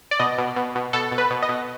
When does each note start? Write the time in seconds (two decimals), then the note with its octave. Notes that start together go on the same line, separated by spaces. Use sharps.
0.11 D5
0.19 B2 D#5
0.38 B2
0.56 B2
0.75 B2
0.93 B2 A4
1.12 B2
1.18 B4
1.30 B2
1.42 D#5
1.49 B2